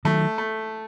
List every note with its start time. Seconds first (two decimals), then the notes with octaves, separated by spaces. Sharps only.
0.05 D#3 F#3 A3
0.38 A3